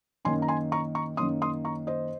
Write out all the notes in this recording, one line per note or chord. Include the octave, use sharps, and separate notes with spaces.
F#2 D#3 A#3 C#4 G#5 C6
A#5
G#5 C6
A#5 C#6
A#5 C#6
F#2 D#3 A#3 C#4 C6 D#6
C6 D#6
A#5 C#6
C5 D#5